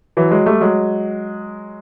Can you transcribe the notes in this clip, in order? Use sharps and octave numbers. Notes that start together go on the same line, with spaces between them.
E3 F#3
F#3 G#3
G3 A3
F#3 G#3